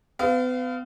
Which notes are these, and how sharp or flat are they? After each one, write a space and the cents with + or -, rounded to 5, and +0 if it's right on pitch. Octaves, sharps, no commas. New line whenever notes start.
B3 +40 F5 -10